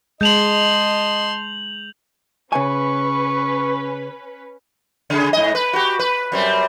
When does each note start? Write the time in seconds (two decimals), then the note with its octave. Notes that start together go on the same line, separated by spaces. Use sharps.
0.21 G#3 D#5 A5 C6 G6 F7 F#7
2.52 C#3 C#4 B4 G#5 C#6
5.10 C#3 G#4
5.33 G#2 D#5
5.55 B4
5.73 F#4 G4
5.99 B4
6.32 F#2 G3 C4